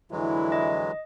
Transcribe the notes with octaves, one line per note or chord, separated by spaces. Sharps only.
F2 D3 E3 F#3 G#3 E4
D#5